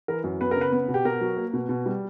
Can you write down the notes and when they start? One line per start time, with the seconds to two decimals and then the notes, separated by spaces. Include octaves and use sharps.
0.08 E3 A#4
0.24 F#2
0.41 B3 B4
0.51 C#3 A#4
0.61 B4
0.72 B3
0.88 B2
0.94 G4
1.05 B2 A#4
1.21 F#3
1.37 A#3
1.53 B2
1.69 B2
1.86 G3